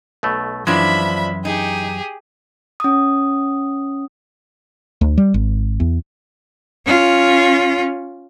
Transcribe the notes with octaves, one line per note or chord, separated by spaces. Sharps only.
B1 B2 A3
F#2 E3 F3 G#3 D4 E5 B5 C6
D#4 G4 G#4
C#4 D#6
D2
G3
G#1
E2
C#4 F4